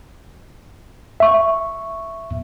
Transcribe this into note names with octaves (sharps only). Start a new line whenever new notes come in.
E5 C#6